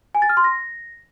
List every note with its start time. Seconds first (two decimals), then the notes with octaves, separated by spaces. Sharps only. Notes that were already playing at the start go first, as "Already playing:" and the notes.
0.15 G#5
0.22 A6
0.29 F6
0.37 C6
0.44 A#6